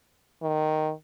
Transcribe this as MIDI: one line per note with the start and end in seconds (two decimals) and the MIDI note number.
0.42 0.92 51